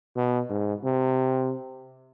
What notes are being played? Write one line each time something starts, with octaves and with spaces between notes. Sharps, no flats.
B2
G#2
C3